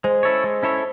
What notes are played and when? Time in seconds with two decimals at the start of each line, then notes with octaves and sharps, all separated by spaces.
0.04 G#3 C5
0.23 C#4 E4 A4 C#5
0.44 G#3
0.63 C#4 E4 A4 C#5